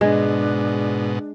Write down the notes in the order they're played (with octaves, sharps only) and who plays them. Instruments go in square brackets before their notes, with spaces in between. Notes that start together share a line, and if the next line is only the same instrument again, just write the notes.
[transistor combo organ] G#2 B2 [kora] G#3 [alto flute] D4